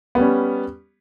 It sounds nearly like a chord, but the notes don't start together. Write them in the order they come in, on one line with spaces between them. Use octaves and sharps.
B3 G3 C#4